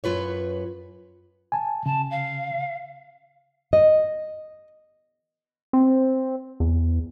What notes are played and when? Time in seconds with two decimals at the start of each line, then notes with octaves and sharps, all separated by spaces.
0.04 F#2 F4 B4 C#5
1.52 G#5 A5
1.86 C#3 A5
2.11 F5
3.73 D#5
5.73 C4
6.60 E2